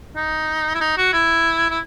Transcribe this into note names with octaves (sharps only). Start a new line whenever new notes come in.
D#4
E4
D#4
F#4
E4
E4